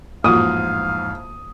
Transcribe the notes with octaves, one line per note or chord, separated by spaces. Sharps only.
A1 F2 G#2 A#3 F4 F#4 F5 D#6